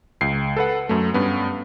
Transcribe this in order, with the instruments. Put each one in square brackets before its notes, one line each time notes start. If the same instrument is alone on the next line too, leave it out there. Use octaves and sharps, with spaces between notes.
[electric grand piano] C#2 C7
A4 B4 F#5
F#2 A3
G2 B3 C#4